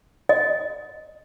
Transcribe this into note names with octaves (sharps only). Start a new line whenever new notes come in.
D#5